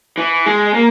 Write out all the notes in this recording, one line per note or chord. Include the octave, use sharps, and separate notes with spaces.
E3
G#3
A#3